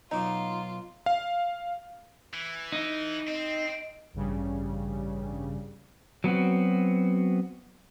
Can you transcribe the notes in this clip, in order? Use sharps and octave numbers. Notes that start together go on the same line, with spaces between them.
B2 F#3 D#4 F4 D6
F5
E3
D#4
C4 D#5
A1 G2 C#3 G3
F#3 B3 C4 F#4